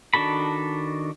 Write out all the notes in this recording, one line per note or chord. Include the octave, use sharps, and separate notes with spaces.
D#3 D4 F#4 A4 B5